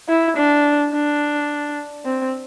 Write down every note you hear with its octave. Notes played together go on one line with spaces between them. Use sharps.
E4
D4
D4
C4